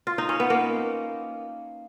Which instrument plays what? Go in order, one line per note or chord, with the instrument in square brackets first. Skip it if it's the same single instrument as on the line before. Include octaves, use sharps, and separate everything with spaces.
[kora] F4
D#4
C#4
B3
A#3